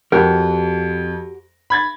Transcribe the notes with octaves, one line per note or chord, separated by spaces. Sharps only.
F2 F#4 G4 A#4
B5 G#6 A6